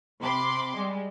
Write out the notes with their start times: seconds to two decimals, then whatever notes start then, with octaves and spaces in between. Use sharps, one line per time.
0.20 C3 B5 C6 D6
0.74 G3 G#3